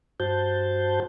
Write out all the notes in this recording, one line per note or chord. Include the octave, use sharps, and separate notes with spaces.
G2 F#4 C5 A5 G6